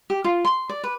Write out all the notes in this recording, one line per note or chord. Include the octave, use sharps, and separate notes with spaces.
G4
F4
C6
D5
B4